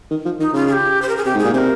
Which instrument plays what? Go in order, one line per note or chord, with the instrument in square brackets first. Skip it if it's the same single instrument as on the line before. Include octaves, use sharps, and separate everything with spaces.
[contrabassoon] D#3
F3
[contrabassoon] D#3 [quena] D#4
[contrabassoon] C#3 [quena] F4
[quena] G#4
G4
C5
A#4
G#4
[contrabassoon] C3 [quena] G4
[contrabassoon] G#2
[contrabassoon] A#2 [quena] G#4
[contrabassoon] C3 [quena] C5
[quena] A#4